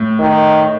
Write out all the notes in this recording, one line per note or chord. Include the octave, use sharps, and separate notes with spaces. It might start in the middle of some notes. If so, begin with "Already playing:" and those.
Already playing: A2
D#3